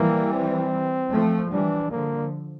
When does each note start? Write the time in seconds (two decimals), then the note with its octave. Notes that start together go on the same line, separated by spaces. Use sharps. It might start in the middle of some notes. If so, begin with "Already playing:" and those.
Already playing: E3 G3 A#3
0.33 C4
1.11 F3 A3
1.51 E3 G3 D4
1.91 D3 F3 A#3